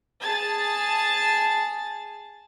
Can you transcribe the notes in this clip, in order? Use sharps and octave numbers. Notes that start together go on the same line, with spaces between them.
G#4 A5 A6